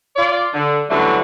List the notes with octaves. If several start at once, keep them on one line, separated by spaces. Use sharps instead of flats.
F4 D5
D3
D3 E3 F#3 G3 A3 C#4